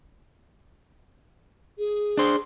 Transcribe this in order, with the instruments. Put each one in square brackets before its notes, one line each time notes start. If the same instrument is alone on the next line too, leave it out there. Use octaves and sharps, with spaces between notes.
[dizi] G#4
[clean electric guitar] D4 C5